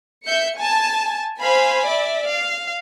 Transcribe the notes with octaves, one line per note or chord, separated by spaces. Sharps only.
E5 G6 C#7
G#5 A5
C5 F5 G#5 B5
D5 E5
F5